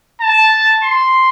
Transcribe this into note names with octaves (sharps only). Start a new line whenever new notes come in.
A5
C6